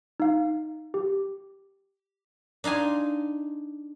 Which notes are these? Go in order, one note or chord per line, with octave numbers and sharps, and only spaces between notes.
D#4 F5
G4
D4 D#4 F5 G#5 C6